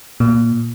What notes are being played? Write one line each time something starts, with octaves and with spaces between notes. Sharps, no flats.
A#2